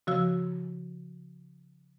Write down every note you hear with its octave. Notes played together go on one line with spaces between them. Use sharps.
C#3 F3 F#4 E6